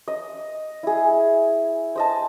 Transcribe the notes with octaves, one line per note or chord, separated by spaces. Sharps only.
D#5
E4 G#4
C5 D#5 A5